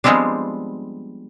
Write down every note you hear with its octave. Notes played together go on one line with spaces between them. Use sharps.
F3 G3 G#3 B3 C4 D4